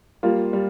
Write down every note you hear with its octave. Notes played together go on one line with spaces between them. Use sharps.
G3 A#3 F4
G3